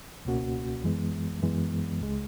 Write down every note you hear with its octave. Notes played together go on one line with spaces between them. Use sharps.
C#2 B2 A#3 C#4 F#4
F#2 E3 G#3 B3
F#2 E3 G#3 B3
C#2 C#3 G#3